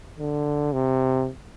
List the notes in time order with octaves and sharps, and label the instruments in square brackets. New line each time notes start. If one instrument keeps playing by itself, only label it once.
[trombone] D3
C3